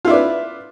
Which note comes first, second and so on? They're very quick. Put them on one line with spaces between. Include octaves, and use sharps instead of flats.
F4 E4 D5 B4